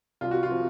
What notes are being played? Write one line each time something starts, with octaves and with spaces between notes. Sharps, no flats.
C2 F4
F#4
F4
C3 F3